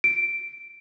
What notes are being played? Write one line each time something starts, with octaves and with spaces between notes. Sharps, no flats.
D7